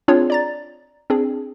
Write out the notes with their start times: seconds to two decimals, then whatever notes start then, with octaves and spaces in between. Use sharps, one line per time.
0.08 C4 D4 F4 G#4 C#5
0.30 D5 A#5 A6
1.10 C4 D4 G#4